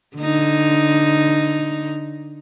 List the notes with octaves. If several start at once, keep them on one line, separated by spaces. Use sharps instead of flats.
D3 D#4